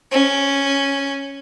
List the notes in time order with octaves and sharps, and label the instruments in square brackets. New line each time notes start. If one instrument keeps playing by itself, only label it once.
[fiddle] C#4